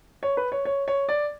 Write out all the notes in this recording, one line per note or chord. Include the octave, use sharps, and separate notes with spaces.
C#5
B4
C#5
C#5
C#5
D5